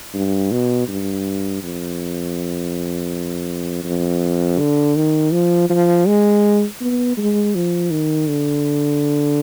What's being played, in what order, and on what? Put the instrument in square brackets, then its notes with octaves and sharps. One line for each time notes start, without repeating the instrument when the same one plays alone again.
[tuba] G2
B2
G2
F2
F2
D3
D#3
F3
F3
G#3
B3
G#3
F3
D#3
D3